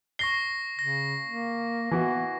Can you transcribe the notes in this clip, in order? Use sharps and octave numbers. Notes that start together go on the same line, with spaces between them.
C#6 A#6 C7 G7
C#3 A#6
A#3
E3 B3 F#4